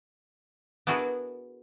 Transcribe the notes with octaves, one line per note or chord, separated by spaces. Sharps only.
B3 D4 E4 F#4 G#4 A#4